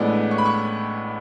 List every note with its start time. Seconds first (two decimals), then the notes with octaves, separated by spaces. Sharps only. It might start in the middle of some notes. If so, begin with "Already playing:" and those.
Already playing: A1 A2 G#3 B3 D4
0.31 C#6
0.38 B5
0.45 C#6